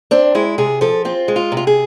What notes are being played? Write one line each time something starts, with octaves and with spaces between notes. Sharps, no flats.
C4 D4
G#3 E4
C3 G#4
F3 A4
C4 F4
G#3
F4
C3
F4
G#4